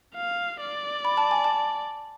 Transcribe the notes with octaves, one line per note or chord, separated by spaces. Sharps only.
F5
D5
B5
A5
G#5
A5